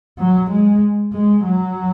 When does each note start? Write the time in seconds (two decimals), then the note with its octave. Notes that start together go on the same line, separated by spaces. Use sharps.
0.19 F#3
0.51 G#3
1.13 G#3
1.45 F#3